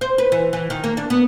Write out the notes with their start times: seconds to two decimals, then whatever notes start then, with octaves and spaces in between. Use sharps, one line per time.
0.01 C5
0.18 B4
0.32 E3
0.53 E3
0.70 D#3
0.84 A#3
0.97 D4
1.10 B3